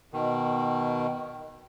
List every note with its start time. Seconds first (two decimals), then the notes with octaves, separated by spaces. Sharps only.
0.13 B2 D#3